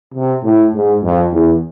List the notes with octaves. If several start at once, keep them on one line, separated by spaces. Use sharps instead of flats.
C3
A2
G#2
F2
E2